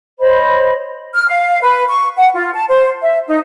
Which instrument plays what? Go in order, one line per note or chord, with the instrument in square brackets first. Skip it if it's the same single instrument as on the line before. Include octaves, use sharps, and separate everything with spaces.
[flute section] C5 C#5 D#5 B5
F6
F5
B4
C#6
F#5
F4
A5
C5
E5
D#4